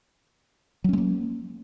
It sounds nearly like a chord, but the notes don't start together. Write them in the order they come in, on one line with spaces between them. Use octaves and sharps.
F#3 C#4 G#3 A#3